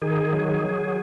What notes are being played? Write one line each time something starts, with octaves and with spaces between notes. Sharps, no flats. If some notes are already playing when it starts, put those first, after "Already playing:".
D#3 G#4
F#3
G#4
F#3